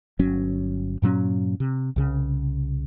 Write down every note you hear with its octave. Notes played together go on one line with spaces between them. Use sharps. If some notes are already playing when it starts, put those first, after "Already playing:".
G1 F#3 C#4
G2 A#2 F#3 C#4
C3
C2 C#3